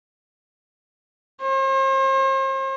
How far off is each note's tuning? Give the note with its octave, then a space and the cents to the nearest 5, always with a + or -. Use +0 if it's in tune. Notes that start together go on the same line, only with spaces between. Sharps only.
C5 +40